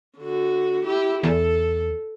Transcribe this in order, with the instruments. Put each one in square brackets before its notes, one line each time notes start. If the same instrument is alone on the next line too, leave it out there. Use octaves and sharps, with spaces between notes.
[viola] D3 F#4
E4 G4
[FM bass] E2 [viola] A4